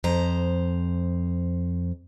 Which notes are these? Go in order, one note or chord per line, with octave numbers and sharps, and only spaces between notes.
F2 C5 A#5